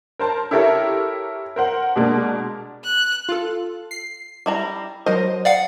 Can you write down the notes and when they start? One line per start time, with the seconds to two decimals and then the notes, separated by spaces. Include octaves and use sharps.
0.19 A#4 C5 A5
0.51 E4 G4 A4 A#4 C#5 E5
1.56 A#4 C5 F#5
1.96 B2 G#3 A#3 D4
2.84 F#6
3.29 F4 A4
3.91 C7
4.46 G3 E4 A#5
5.06 F#3 A#4 C5 D#5
5.45 D5 F5 F#5